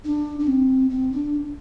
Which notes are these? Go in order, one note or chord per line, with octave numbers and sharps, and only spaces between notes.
D4
D4
C4
C4
D4